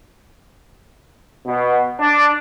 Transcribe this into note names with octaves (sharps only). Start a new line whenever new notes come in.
B2
D4